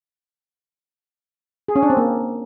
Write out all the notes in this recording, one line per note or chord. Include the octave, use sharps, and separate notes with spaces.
G#4
C#4
D4
C4
A#3